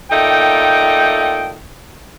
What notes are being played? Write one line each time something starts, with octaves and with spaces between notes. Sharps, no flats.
A#2 A3 D#4 G5